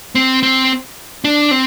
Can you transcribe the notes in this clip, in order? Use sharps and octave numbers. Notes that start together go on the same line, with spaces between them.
C4
C4
D4
C4